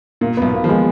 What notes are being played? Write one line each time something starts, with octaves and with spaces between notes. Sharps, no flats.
A#2 A#3
B3
B1
A#3
F3
G#3